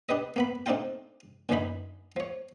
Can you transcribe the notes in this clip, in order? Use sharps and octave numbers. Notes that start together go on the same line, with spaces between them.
D4 G4 B4 D#5
A#3 B3 B5
A3 C4 D4 D#4 F4 G5
F#2 A#2 D3 E3 D#4 B5
F3 C#5